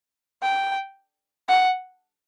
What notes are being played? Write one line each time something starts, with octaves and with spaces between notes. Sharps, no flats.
G5
F#5